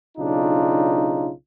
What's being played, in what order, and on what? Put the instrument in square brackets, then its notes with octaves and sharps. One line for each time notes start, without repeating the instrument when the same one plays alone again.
[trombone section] B1 C#3 D4 D#4 F4